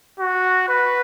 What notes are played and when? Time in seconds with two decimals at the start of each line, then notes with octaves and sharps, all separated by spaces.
0.19 F#4
0.69 B4